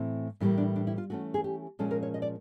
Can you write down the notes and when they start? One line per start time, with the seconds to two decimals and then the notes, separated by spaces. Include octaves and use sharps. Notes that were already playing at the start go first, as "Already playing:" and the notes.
Already playing: A2 E3 A3 C4
0.40 A2 E3 G3 A#3 C#4
0.58 D4
0.76 D4
0.87 E4
0.98 F4
1.10 E3 A3 C#4 F#4
1.34 G#4
1.44 G4
1.79 A#2 F3 G#3 C#4 A4
1.91 A#4
2.03 C#5
2.14 D#5
2.22 D5